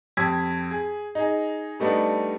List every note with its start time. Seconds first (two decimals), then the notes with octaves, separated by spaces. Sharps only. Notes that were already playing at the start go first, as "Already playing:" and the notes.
0.17 F2 G4 E6 G#6 B6
0.71 G#4
1.15 D#4 G#4
1.80 G3 A3 B3 D4 D#4